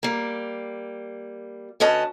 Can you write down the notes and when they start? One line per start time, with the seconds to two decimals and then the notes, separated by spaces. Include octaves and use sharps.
0.03 G3 A#3
1.80 D2 C#4 B4 D#5 A5